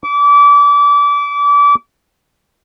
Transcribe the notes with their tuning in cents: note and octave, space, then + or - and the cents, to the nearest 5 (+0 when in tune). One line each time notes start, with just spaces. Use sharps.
D6 -30